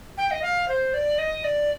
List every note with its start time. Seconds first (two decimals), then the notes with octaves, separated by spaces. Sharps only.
0.17 G5
0.31 D#5
0.42 F5
0.68 C5
0.94 D5
1.18 D#5
1.44 D5